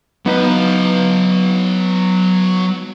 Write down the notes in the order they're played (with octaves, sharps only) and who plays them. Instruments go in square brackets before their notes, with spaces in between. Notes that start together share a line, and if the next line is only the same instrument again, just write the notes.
[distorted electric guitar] F#3 F5 [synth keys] B3 D#4 B4